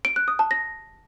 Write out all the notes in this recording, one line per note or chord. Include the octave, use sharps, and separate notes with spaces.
D7
F#6
D#6
A5
A#6